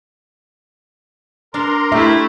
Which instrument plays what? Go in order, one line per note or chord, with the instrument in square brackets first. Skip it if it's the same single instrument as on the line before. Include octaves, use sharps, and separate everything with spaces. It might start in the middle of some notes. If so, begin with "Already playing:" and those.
[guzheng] D4 [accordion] A#4 A#5 C6
[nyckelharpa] A3 E4 [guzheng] G4 [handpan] E5